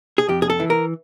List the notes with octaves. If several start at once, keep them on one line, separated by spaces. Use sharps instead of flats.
G#4
F2 G4
G#4
A4
E3
A#4